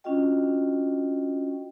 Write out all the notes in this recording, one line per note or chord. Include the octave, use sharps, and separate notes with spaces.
C#4 D4 F4 F#4 D#5 G5